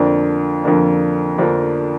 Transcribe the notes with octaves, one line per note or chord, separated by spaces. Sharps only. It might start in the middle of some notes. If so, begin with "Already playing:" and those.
Already playing: F2 D3 F3 A#3 D4
F2 D3 F3 A#3 D4
F2 D3 F3 A#3 D4